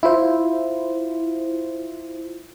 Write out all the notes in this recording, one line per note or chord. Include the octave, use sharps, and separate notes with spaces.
E4 F4 C5